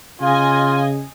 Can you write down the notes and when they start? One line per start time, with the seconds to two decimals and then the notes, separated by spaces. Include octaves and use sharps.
0.21 C#3 F4 D#5 F5 G#5